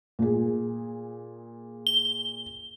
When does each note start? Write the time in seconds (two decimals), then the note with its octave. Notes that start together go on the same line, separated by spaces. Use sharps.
0.19 A#2 G#4
1.87 G7